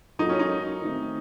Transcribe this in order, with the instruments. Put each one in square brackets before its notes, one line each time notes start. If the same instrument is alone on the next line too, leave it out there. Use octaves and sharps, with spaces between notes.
[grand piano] F#3 A#3 F4 A4 [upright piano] D#4
[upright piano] C#4
D#4
[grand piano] D#3 A3 C4 D#4